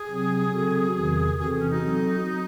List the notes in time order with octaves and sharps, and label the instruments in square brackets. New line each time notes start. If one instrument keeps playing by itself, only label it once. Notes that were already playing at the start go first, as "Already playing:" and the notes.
Already playing: [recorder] G#4
[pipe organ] C3 F#3 C4
C#3 F#3 C4 F#4 A4
E2 C3 D#3
[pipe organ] C3 E3 C4 F#4 A4 [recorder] G#4
[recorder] C#4
D#4
[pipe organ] F#3 C4 F#4 A4